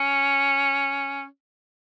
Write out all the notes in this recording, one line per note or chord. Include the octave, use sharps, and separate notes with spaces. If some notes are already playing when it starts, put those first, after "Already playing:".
Already playing: C#4